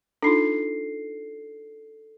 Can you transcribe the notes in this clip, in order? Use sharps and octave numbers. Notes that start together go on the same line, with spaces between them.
D4 D#4 F4 A4 C7